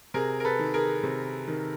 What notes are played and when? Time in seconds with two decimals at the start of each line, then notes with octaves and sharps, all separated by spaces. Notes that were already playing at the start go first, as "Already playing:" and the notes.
0.14 C3 G#4 A#4
0.40 A#4
0.45 A4 B4
0.59 D#3
0.74 G#4 A#4
1.03 C3
1.48 D#3